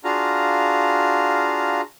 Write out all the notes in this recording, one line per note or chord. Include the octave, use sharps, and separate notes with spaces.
D4 F4 F#4 G#4 F5 A#5